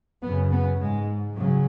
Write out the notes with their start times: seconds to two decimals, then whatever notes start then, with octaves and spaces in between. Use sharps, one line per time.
0.22 F#2 C#3 B3
0.51 B3
0.80 G#2 G#3
1.38 C#3 F#3